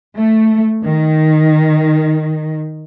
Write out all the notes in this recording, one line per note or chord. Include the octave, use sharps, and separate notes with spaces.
A3
D#3